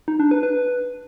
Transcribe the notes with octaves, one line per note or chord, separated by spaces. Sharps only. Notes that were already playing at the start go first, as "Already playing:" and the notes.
D#4
D4
B4
B4